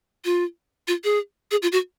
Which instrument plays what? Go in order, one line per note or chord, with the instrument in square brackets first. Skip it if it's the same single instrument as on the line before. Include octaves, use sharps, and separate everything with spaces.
[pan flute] F4
F4
G#4
G#4
F4
F#4